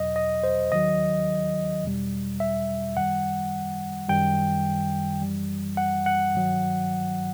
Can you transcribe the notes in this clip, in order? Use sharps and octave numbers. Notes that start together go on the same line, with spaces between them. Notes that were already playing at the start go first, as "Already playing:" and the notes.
Already playing: E2 B2 F#3 D#5
D#5
C5
D#2 D#3 F#3 D#5
E2 B2 G3
E5
F#2 D#3 G3 F#5
F#2 D#3 G3 G5
F#2 E3 G3
F#5
F#5
G2 D#3 F#3